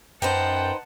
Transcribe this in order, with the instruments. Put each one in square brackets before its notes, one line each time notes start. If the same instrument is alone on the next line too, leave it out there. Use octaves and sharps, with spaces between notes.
[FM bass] F#2 [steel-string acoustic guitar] D#4 B4 C5 [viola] F#5 A5 [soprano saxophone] G5